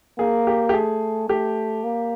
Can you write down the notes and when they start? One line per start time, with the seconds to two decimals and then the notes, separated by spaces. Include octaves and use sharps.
0.19 A#3 G#4
0.47 G4
0.69 G4
0.74 A3 G#4
1.29 A3 G4
1.84 A#3